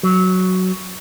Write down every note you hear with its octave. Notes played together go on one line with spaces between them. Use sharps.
F#3